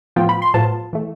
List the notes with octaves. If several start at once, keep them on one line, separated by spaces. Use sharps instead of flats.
A2 F3 B3 F4 G5
B5
C6
A2 F3 B3 F4 A5
E3 A3